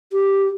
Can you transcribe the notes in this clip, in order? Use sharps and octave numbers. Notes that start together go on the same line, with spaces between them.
G4